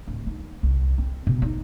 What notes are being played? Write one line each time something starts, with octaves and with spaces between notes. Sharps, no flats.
D1
D#4
C2
C4
B2
D#4